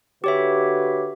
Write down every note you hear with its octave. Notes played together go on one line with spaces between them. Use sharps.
D3 F#4 G4 B4 C#5 E5